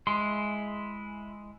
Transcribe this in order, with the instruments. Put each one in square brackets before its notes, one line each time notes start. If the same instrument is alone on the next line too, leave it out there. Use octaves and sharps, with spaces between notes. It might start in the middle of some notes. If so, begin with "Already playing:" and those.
[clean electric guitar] G#3 [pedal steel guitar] E4 C6